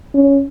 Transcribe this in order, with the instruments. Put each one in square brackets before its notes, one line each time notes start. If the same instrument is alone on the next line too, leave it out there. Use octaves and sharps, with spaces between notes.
[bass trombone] C#4